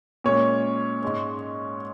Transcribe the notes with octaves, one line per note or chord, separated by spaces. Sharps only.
A#2 G#3 C#4 C#5
G#2 G#3 C#4